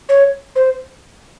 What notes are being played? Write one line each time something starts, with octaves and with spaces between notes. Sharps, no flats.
C#5
C5